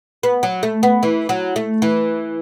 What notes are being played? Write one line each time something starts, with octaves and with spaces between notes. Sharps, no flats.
B3
F#3
A3
B3
E3
F#3
A3
E3